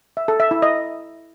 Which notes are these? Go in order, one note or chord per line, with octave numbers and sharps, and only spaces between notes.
E5
A4
E5
E4
D#5